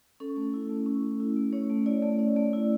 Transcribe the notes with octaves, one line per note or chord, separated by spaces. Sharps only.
C#4 A4
A3
E4
A3
C#4
A3
E4
A3
C#4 C#5
A3
E4 D5
A3
C#4 D5
A3
E4